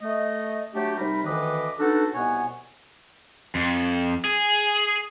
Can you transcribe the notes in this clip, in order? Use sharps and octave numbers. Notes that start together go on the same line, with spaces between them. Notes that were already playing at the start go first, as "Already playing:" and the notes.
A3 D#5
F#3 A3 D4 G4
C3 G3 D#4 A#4 B5
D2 D#3 E3 B4 D#5 D6
B3 D4 D#4 F#4 A4
C2 B2 B3 C#5 F#5 G#5
F2
G#4